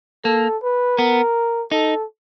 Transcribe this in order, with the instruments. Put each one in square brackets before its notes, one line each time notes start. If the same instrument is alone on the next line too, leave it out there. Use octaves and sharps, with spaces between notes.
[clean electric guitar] A#3 [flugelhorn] A4
[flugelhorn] B4
[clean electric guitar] B3 [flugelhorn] A#4
[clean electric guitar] D#4 [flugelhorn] A4